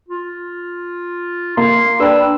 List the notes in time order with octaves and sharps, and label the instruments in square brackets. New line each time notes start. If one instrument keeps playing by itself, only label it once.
[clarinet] F4
[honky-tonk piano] A#3 [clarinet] C6
[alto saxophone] D4 [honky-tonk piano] B4 G5 [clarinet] E6